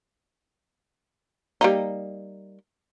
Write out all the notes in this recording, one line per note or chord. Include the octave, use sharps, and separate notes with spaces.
G3 A#3 D#4